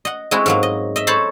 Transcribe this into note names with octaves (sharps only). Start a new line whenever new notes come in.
D#5 F#5
G#3 C4 E4 F#4
G#2 F#3 A#3
D#5
D#5 E5
A4 C5 C#5 A5 B5